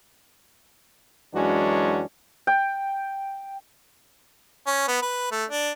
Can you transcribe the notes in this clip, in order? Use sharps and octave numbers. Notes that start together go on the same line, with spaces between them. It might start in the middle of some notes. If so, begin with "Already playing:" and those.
F#2 E3 G#3 C#4 D4 F#4
G5
C#4
B3
B4
A3
D4